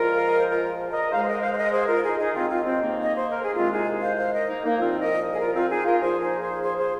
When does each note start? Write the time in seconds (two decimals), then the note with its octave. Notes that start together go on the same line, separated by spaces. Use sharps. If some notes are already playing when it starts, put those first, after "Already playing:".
Already playing: A#2 F3 G#3 F4 A#4
0.14 F5
0.26 D#5
0.38 C5
0.50 F4 A#4
0.91 A#4 D#5
1.11 G#2 G#3 C5 F5
1.22 C5
1.27 A#4 D#5
1.42 C5 F5
1.52 C5
1.58 A#4 D#5
1.72 G#4 C5
1.87 F4 A#4
2.03 D#4 G#4
2.18 D#4 G#4
2.34 D#2 D#3 G#3 C4 F4
2.49 C4 F4
2.64 C4
2.80 A#3 D#4
3.03 D#5
3.16 C5
3.29 A#4
3.43 G#4
3.56 C2 C3 D#3 G#3 C4 F4
3.72 D#4 G#4
4.02 C5 F5
4.17 C5 F5
4.32 A#4 D#5
4.48 A#3 D#4
4.64 A#3 D#4
4.78 C2 A#2 F3 C4 F4
4.99 A#4 D#5
5.33 G#4
5.40 F4 A#4
5.55 C4 F4
5.70 D#4 G#4
5.85 F4 A#4
6.00 A#2 F3 A#3 G#4 C5
6.21 D#4 G#4
6.41 G#4 C5
6.63 G#4 C5
6.77 G#4 C5